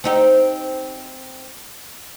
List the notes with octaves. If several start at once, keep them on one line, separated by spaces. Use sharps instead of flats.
C4 D#4 G4